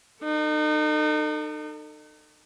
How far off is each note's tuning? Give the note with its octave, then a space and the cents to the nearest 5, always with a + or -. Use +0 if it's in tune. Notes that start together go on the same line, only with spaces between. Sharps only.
D#4 -35 A4 +30